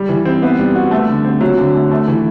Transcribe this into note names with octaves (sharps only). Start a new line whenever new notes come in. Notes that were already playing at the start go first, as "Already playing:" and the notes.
Already playing: G3
E3
C4
B3
G3
F#4
A3
D3
C4
F#3
D3
A3
A3
E3